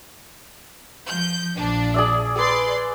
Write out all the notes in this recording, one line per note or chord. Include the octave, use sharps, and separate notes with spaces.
F3 G6
A#1 F3 D4
G#4 D5 E5
G#4 B4 D5 C6